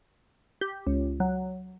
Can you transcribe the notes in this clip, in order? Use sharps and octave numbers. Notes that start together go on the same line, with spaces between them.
G4
C#2
F#3